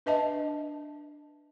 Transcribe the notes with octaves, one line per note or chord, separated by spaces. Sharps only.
D4 B4 D#5 E5 A5